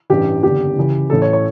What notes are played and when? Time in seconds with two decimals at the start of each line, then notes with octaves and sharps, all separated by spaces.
0.10 A1 G2 E3 G4
0.43 F#1 E2 D3 G4
0.76 C#2 C#3 E3
1.10 A1 A2 E3 A4
1.22 C#5
1.33 C#5